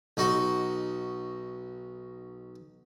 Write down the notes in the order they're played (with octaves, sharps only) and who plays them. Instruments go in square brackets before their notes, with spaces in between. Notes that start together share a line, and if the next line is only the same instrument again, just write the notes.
[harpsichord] B1 D#4 F#4